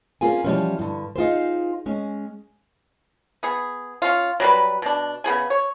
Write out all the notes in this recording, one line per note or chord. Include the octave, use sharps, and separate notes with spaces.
A#3 C4 C#4 F4 G#4 G#5
E3 F3 G3 G#3 C4 C#4
G2 D3
D#4 F4 G#4 C5
G#3 C#4
B3 G#4
C#4 F4
F#3 G3 B4
B2 D4
C#3 B3 G#4 G#5
C#5